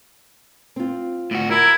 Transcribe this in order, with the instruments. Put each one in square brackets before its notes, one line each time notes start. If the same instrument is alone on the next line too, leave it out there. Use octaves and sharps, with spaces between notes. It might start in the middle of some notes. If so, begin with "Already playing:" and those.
[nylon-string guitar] C4 F4
[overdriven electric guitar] A2 F#4
[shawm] E4 [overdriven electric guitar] A#4 [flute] G#6